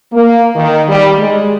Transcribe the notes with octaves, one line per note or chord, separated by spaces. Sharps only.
A#3
D#3
G3
G#3